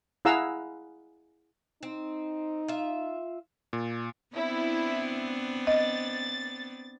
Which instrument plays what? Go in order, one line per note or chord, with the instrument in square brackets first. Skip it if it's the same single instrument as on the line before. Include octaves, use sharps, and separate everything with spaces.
[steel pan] E4 G#4 F5 F#5 A#5 E6
[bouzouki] C4 [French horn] D#4
[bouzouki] F4 E5
[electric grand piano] A#2
[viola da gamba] B3 C4 D4 [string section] E4
[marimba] D#5 [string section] A6